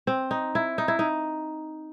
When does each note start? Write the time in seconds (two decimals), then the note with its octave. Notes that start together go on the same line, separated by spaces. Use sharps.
0.07 C4
0.31 D#4
0.55 E4
0.78 D#4
0.88 E4
0.99 D#4